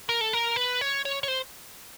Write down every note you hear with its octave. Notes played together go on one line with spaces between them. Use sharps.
A#4
A4
A#4
B4
C#5
C#5
C#5
C5